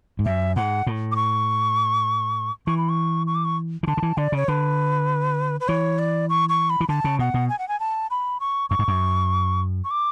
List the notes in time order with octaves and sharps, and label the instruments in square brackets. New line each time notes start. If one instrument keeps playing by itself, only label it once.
[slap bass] G#2
[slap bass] F#2 [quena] E5
[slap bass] G#2 [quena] F#5
[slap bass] A2
[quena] D6
C#6
[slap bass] E3 [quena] C#6
[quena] B5
C#6
C#6
D6
C#6
[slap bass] E3
[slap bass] D3 [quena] A5
[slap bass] D3
E3
[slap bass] D3 [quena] D5
[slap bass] C#3 [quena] C#5
[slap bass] D3 [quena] B4
[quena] B4
[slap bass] E3 [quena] C#5
[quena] D5
C#6
C#6
B5
[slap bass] E3
[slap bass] D3 [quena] A5
[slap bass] C#3
[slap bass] B2 [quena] F#5
[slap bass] B2
[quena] G#5
F#5
G#5
A5
B5
C#6
[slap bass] F#2 [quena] C#6
[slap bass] G#2
F#2
[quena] C#6
D6